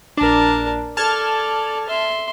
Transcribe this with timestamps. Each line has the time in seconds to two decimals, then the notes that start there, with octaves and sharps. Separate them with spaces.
0.17 A#1 D4 A#4 A5
0.97 A4 D5 A5 F6 G#6
1.88 E5 C6